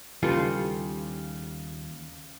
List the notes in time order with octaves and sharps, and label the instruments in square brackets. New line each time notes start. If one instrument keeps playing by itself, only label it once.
[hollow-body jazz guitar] D#2 G3 G4 [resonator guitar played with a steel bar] C#3 [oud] F4 [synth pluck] A4 B4 C#7